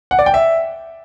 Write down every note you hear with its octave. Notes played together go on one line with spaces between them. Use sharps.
F#5
D5
G5
E5